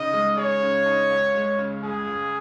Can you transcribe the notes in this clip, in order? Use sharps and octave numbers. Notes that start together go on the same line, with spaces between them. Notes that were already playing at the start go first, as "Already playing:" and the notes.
Already playing: C#3 D#4 D#5
G#3
G#4 C#5
C#3
D#4
C#2
G#3
C#3
C#2 G#4
C#2